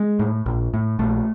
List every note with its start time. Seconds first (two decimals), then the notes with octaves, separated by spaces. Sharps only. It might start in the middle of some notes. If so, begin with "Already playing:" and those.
Already playing: G#3
0.19 A2
0.46 A#1
0.74 A2
0.99 A#1 A3